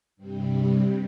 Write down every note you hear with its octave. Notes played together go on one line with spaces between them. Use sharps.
G2 C3 G3